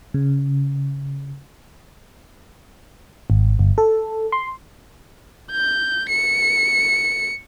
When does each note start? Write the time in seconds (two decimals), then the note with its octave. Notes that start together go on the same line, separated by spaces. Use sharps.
0.14 C#3
3.30 G#1
3.59 G1
3.78 A4
4.32 C6
5.52 G6
6.09 C#7